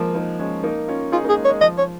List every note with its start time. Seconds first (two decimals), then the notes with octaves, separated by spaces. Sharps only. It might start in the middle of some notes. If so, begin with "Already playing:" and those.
Already playing: F3 G#3 A#3
0.15 A#3 D#4
0.39 G#3 C#4
0.64 A#3 D#4
0.88 C#4 F4
1.12 D#4 F4 G#4
1.25 A#3 D#4 G#4
1.37 G#3
1.45 C#5
1.49 G#3
1.61 F3 D#5
1.78 C#5